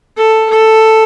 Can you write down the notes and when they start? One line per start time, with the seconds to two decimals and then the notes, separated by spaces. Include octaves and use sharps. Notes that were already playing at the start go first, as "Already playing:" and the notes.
0.17 A4
0.50 A4